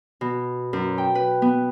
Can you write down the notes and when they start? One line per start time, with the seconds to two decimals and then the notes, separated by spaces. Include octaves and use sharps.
0.21 B2
0.73 F#2
0.98 G5
1.15 B4
1.42 B3